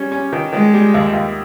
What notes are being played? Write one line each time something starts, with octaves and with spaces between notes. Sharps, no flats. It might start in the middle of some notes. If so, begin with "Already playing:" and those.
Already playing: G3 C#4
C#4
D#3
D#3 G#3
G3
D#2
D#2